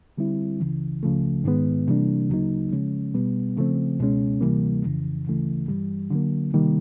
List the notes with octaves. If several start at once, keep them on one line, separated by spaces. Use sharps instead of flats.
D3 G3 C4 E4
C#2 C#3 E3
C#2 C#3 F3 A3
G#2 D#3 G#3 B3
C3 E3 G3 A#3 D4
D2 C#3 F#3 A#3 D#4
C#3 F3 G#3 C#4
B2 G3 B3
C#3 F3 A3 C4
C#2 B2 G#3 C#4
D2 C3 E3 G3 A#3
F2 C#3 E3
D2 C#3 E3 A3
G2 E3 G3
D3 F#3 A#3
C3 D#3 G3 A#3